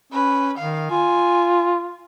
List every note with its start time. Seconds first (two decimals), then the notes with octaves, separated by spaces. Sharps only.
0.13 C#4 B4
0.58 D#3 F5
0.91 F4 G#5